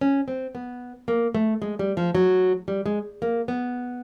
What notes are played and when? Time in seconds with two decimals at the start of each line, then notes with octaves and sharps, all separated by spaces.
0.01 C#4
0.28 C4
0.55 B3
1.08 A#3
1.35 A3
1.62 G#3
1.79 G3
1.97 F3
2.15 F#3
2.68 G3
2.86 G#3
3.22 A#3
3.48 B3